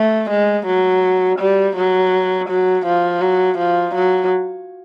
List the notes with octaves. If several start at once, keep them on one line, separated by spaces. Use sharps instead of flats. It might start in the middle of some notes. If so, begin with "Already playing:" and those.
Already playing: A3
G#3
F#3
G3
F#3
F#3
F3
F#3
F3
F#3